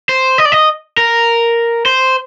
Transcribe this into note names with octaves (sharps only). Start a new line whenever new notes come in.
C5
D#5
D5
D#5
A#4
C5